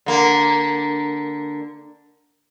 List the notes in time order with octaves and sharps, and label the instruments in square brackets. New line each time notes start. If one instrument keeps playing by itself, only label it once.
[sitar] D3 A#3